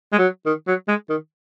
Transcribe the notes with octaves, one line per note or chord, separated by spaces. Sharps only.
G#3
F#3
D#3
F#3
G#3
D#3